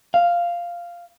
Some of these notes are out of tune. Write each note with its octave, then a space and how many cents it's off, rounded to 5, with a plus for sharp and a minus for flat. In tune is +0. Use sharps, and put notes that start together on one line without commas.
F5 -5